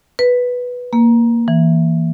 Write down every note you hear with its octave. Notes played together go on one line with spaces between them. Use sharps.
B4
A#3
E3